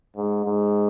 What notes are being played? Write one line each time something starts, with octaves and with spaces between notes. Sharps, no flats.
G#2
G#2